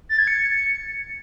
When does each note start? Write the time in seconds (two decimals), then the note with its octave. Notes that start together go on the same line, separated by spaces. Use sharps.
0.09 A6
0.18 G#6
0.27 C#7